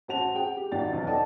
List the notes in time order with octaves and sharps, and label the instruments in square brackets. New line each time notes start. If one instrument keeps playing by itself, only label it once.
[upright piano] A1 C4 F#4 A5 F7
G#4 F#5 G5
G4
G#1 F#4 D5 G5 A6
B1 E2
A4 D5 D#5 F#5 G5 A5